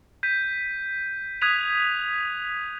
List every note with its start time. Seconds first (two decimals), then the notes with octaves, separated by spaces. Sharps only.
0.23 G6 B6 D#7
1.41 D#6 F#6 G#6 B6 D#7 F7